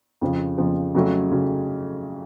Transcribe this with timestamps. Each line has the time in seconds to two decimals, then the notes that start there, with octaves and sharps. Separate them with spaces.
0.21 F2 C#3 F3
0.58 F2 C#3 F3
0.95 F2 C#3 F#3 A3 C#4
1.31 C#3 F#3